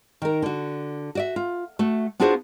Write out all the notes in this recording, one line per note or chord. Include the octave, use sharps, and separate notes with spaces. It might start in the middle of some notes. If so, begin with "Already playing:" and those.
D#3 A#4
D3 F#4
F#4 D5 E5
F4
A3 F#4
B3 D4 F4 F#4 G#4 C5